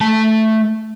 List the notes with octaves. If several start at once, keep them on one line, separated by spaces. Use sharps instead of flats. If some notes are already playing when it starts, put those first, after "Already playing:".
A3 A5